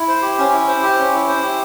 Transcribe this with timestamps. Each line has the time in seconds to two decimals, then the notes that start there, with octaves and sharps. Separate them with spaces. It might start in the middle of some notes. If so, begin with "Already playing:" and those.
Already playing: E4
0.08 C5
0.22 G4
0.38 C#4
0.52 E4
0.68 C5
0.83 G4
0.98 C#4
1.13 E4
1.28 C5
1.42 G4